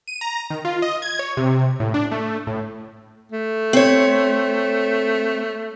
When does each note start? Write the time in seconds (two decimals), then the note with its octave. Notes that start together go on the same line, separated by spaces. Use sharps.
0.08 D#7
0.21 A#5
0.50 D#3
0.65 F4
0.82 D#5
1.02 G#6
1.19 C#5
1.37 C3
1.80 A2
1.94 D4
2.11 A3
2.47 A2
3.32 A3
3.73 C4 C#5